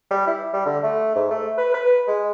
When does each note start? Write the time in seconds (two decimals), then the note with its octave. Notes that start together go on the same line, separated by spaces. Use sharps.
0.11 G3
0.27 E4
0.54 G3
0.66 D3
0.83 A3
1.15 G#2
1.31 A3
1.58 B4
1.74 B4
2.08 G#3